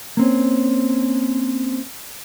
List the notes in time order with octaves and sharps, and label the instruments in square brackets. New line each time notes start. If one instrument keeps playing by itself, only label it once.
[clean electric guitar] A#3 C4 C#4